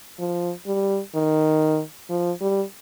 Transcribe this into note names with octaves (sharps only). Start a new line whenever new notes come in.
F3
G3
D#3
F3
G3